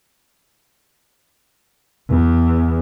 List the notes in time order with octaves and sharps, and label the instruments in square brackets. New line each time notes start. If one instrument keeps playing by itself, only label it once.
[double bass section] E2